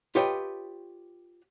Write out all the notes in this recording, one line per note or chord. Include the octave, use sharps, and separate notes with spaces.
F4 G4 B4 C#5 D#5 G5